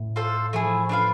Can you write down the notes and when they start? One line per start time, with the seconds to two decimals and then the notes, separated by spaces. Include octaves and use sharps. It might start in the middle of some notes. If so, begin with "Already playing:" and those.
Already playing: A2
0.16 F4 A4 C5
0.53 F3 A3 E4 G#4
0.89 D4 F4 B4 F5